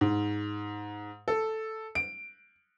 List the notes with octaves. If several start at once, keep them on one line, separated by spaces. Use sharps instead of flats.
G#2
A4
D7